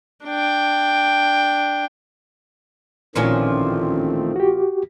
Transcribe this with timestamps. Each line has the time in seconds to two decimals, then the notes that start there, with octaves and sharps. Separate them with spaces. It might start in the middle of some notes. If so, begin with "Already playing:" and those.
0.25 D4 G5
3.16 A1 A#2 D#3 F3 A3 C4 C#4
4.36 F#4 G4